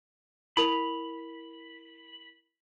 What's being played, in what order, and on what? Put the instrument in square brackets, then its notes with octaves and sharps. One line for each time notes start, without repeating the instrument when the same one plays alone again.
[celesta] E4 A#4 F7 [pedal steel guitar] B5